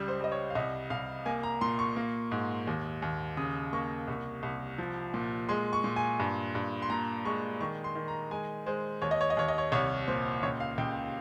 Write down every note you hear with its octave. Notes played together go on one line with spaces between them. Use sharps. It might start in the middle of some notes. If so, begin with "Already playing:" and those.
Already playing: C#2 G3
C5
G3 D#5
C#5
F5
C2 D#5
C2 F5
A#3 G#5
A#5
A#2 C6
C#6
A#3
G#2
D#2
D#2
C#3 D#6
A#3 C#6
C2
C2
F3
A#2
G#3 C6
C#6
A#2
G#5
G2
G2
C6
A#2 A#5
G#3 C#6
D#3 C#6
C6
D#3
A#5
G#3 G#5
G#3 C5
D#2 C#5
D#5
C#5
D#5
D#2 C#5
D#5
C#5
C2 C#5
A#2 C5
C#2 C#5
F5
C#2 G5